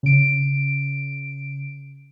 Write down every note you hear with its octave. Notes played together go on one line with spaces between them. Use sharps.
C#3 D7